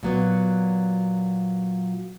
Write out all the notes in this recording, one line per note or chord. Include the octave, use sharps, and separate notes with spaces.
A#2 F#3 B3